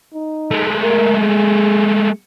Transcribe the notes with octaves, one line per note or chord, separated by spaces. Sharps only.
D#4
G#3 A3
A#4
G#4